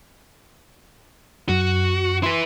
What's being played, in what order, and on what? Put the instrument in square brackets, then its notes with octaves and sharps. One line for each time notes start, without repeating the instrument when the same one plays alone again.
[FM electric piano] F#2 [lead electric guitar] F#4
[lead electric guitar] E4 B4 [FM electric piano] C6